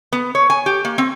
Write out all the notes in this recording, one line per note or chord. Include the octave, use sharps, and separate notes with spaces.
B3
C#5
G#5
G4
A#3
C4